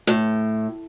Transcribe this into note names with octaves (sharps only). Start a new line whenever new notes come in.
A2